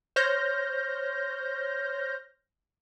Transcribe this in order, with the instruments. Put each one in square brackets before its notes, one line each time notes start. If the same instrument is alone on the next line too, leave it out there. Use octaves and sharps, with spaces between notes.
[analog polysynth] C5 C#5 F6 G6 A#6